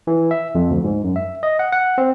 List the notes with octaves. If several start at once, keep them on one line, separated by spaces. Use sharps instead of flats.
E3
E5
F2
D2
G#2
F#2
E5
D#5
F#5
F#5
C4